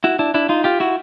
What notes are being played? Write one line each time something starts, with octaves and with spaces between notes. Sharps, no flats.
E4 F#4
D4 E4
D4 E4
D#4 F4
F4 G4
E4 F#4